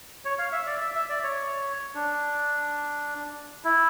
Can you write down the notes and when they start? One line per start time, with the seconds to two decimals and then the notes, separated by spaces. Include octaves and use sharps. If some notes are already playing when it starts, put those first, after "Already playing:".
0.25 C#5
0.39 F5
0.52 E5
0.67 D5
0.81 E5
0.95 E5
1.09 D5
1.23 C#5
1.95 D4
3.65 E4